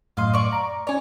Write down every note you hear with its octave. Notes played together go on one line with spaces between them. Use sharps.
F#2 A2 D#5 F5 C6
D5 C#6
A#5
C#4 C#5 D5 G#5